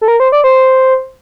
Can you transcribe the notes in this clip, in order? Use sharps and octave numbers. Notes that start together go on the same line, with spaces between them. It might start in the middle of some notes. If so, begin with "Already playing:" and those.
A4
A#4
C5
D5
C5